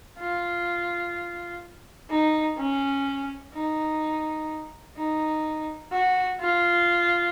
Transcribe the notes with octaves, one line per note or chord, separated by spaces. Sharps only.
F4
D#4
C#4
D#4
D#4
F#4
F4